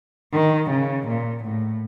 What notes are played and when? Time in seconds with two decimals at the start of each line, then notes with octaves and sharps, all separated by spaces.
0.33 D#3
0.70 C#3
1.07 A#2
1.44 A2